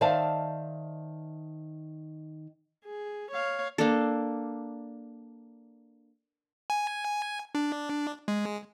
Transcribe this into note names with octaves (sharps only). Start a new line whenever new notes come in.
D#3 C5 D5 E5 F5 A5
G#4
C#5 F5
A#3 D4 A4
G#5
D4
G#3